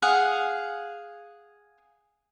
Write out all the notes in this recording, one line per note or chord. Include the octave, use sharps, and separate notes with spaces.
G#4 F5 F#5